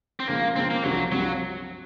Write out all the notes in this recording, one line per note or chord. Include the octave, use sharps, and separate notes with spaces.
C4
C#3 F3 G#3 A#3
C#3 F3 G#3 C4
A#3
C2 C3 F3 F#3
C2 C3 F3 F#3